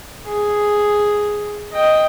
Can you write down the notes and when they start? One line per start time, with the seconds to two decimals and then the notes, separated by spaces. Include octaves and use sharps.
0.25 G#4
1.72 D#5 G5